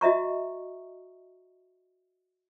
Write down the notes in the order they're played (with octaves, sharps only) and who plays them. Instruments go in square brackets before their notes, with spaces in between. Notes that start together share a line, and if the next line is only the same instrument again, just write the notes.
[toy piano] F#4 D#5 E5 A#5 C#6